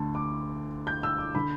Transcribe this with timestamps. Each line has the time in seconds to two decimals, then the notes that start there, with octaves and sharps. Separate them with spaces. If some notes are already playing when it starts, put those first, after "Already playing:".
Already playing: D2 D3 A5
0.15 D6
0.87 G6
1.03 E6
1.18 D6
1.35 D3 B5